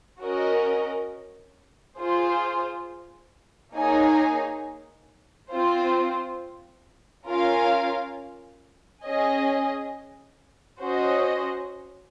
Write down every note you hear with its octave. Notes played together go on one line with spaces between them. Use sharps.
C#4 F#4 A#4 D#5
F4 G#4 C5
A#3 D#4 G#4 C#5 G#5
C4 F4 C5
C#4 F4 A#4 F5 G#5
C#4 G#4 D#5 G#5
C#4 F#4 C5 D#5